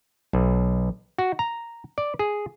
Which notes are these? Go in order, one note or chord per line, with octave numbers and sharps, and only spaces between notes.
B1
F#4
A#5
D5
G#4